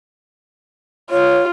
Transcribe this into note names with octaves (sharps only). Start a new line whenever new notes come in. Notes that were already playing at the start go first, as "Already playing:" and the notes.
F4 C#5